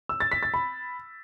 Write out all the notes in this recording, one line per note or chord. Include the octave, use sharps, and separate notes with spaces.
E6
A6
B6
A6
B5